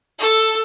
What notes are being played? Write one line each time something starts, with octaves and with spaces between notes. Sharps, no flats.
A4